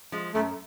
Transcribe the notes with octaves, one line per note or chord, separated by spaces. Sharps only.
F3 G#3
F#2 A3